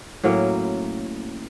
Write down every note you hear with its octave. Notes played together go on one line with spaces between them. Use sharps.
A2 F#3 A#3 C#4